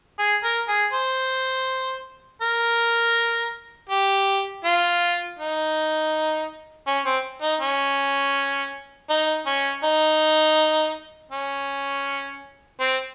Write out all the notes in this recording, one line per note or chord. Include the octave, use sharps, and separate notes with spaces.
G#4
A#4
G#4
C5
A#4
G4
F4
D#4
C#4
C4
D#4
C#4
D#4
C#4
D#4
C#4
C4